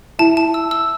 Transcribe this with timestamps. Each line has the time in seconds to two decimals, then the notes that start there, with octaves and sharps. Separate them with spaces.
0.19 E4 A5
0.37 A5
0.54 E6
0.71 E6